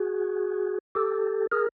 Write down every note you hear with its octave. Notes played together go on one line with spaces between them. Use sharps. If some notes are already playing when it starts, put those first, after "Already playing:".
Already playing: F#4 G#4
G4 A4
G#4 A#4